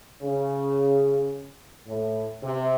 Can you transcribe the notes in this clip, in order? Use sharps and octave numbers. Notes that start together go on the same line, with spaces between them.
C#3
A2
C3